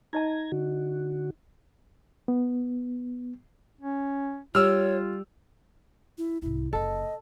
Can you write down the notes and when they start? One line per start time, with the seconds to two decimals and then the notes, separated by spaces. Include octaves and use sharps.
0.13 D#4 D#5 A5 A#5 G#6
0.52 D3 F#4
2.28 B3
3.81 C#4
4.55 G3 F4 C#5 E6 F6
6.18 E4
6.42 C2 G#2 E4
6.73 F#1 C#4 A4 D#5